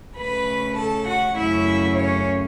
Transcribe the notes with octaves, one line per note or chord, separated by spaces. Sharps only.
C#3 A3 C#4 B4 B5
A4 A5
F#4 F#5
F#2 C#3 A3 C#4 E4 E5
C#4 C#5